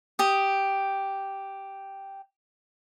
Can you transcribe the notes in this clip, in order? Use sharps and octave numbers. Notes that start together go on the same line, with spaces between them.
G4 D#6